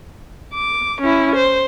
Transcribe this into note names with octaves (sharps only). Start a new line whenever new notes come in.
D6
C#4 E4
C5